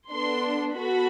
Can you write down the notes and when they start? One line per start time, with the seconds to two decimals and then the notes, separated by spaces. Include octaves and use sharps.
0.11 B3 D4 A4 C6
0.76 B3 F#4 A4 B5